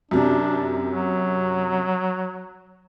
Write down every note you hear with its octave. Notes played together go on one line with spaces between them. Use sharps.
F#2 C3 D4
F#3